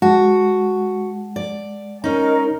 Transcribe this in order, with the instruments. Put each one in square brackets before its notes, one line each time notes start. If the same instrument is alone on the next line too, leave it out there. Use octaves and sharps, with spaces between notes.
[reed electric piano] G#3 F#5 A5 [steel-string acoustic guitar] F#4
[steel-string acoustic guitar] D5
[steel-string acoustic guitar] C#4 D#4 [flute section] A#4 D#5